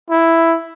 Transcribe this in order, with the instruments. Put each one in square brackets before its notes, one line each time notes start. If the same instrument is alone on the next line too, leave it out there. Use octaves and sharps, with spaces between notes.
[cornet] E4